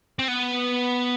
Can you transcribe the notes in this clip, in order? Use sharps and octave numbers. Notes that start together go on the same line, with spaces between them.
C4
B3